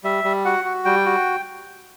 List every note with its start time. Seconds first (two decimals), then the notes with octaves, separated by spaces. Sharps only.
0.04 G3 E5
0.24 G3
0.45 F#4 F#5
0.65 F#4
0.85 G3 G5
1.05 F#4